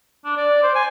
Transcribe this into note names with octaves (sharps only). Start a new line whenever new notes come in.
D4
D5
C5
G#5